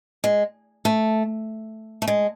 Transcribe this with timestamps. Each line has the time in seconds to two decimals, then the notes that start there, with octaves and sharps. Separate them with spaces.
0.24 G#3
0.85 A3
2.02 A3
2.07 G#3